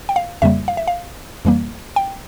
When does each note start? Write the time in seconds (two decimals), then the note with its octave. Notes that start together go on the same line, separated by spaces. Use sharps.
0.09 G5
0.16 F5
0.42 F2 C#3 G3 A#3 E5
0.68 F5
0.77 E5
0.88 F5
1.45 F2 E3 G3 A#3
1.96 G5